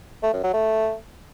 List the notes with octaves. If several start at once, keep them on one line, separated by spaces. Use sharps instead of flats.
A3
F#2
F#3
A3